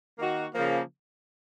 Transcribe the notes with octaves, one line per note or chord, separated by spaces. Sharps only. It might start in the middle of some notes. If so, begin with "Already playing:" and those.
D#3 A#3 D#4 F#4
C#3 F3 A#3